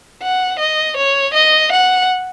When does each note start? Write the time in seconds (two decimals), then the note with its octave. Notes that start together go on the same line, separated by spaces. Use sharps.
0.23 F#5
0.59 D#5
0.97 C#5
1.34 D#5
1.72 F#5